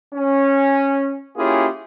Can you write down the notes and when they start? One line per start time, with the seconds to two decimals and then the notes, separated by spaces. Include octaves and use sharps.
0.15 C#4
1.36 A#3 C#4 E4 F4 G4 G#4